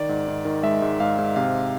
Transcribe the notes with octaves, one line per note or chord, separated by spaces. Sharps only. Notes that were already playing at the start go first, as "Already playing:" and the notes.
Already playing: D#3 D5
G#2
G#2
D#3
G#3 E5
G#2
G#2 F5
G#2
C3 F5